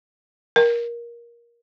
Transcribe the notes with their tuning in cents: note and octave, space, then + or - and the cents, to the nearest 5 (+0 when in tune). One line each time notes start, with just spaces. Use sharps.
A#4 +20